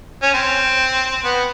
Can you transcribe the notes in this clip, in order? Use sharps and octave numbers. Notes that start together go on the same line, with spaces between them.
C#4
C4
B3